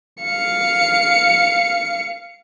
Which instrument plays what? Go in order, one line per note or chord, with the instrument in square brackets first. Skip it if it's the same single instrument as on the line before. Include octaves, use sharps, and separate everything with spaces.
[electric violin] F5 C#7